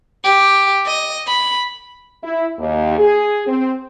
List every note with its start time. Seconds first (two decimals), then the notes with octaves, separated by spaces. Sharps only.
0.24 G4
0.86 D#5
1.28 B5
2.23 E4
2.59 D#2
2.98 G#4
3.47 C4